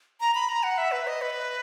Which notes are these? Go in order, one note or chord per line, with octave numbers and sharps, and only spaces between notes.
A#5
B5
A#5
F#5
E5
B4
D#5
B4